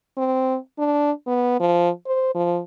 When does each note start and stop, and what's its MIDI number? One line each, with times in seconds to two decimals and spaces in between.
0.17 0.56 60
0.79 1.11 62
1.27 1.59 59
1.60 1.90 53
2.07 2.32 72
2.35 2.59 53